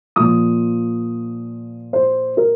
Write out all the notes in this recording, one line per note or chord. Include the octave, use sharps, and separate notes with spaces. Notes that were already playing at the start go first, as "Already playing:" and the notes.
A#2 F3 D#6
C5
A#4